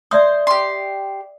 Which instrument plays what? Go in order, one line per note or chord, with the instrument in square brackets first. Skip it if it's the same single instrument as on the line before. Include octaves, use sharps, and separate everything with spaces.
[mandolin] C5 [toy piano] D5 E5 D#6
[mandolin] G4 C6